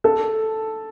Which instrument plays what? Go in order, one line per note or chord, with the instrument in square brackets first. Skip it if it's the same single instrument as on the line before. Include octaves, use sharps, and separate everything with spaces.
[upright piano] A4